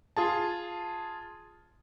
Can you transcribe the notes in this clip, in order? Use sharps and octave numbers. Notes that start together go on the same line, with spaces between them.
F4 G#4 A5